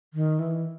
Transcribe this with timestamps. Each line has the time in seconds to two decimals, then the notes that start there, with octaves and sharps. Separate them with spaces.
0.14 D#3
0.39 E3